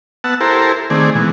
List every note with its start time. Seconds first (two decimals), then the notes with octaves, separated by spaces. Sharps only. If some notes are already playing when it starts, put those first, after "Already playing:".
0.24 B3 F#5 A5 E6
0.41 E4 G4 A4 A#4 C5
0.90 D#3 A3 C4 G#4 D5
1.15 B2 E3 G#3